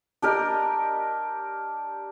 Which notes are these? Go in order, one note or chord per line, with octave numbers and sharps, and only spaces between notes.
D4 G4 A#4 D#5